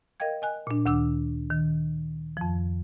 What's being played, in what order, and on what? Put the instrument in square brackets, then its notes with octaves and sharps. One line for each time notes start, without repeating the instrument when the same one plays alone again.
[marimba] A#4 D#5 F5 G5 G#6
D#5 G#5 F#6
A#2 D4
D2 D#3 D4 D6 E6
D#3
F2 F3